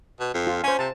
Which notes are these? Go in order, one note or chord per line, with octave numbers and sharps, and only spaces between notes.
B2
F2
F4
C#4 C5 G#5
C3 A5